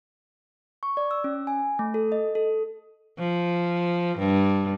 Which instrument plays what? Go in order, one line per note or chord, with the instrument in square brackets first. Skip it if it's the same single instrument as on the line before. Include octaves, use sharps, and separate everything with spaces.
[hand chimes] C#6
D5
E6
C#4
G#5
A3
A4
D#5
A4
[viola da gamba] F3
G2